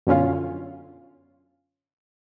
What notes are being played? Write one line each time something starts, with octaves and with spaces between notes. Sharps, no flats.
F#2 B2 D3 C#4 F4